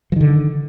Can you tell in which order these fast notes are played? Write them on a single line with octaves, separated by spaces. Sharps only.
F3 D#3 D3